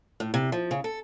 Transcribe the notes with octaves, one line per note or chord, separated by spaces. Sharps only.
A2
C3
F3
C#3
A4